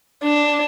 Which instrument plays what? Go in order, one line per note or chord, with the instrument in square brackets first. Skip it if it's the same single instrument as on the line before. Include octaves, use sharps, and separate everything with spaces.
[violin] D4